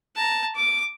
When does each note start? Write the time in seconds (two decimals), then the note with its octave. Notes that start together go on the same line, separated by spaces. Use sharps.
0.16 A5 A#5
0.55 D6